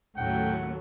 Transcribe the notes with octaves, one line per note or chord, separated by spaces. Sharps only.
D#2 A2 F#3 A3 C#4 F#5 G5